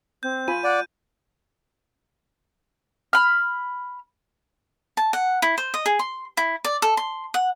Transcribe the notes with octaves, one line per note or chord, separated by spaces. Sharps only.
C4 G6
F4 G#5 B5 D#7
D5 F#5
B5 F6
A5
F#5
E4
C5
D#5
G#4
C6
E4
D5
A4
C6
F#5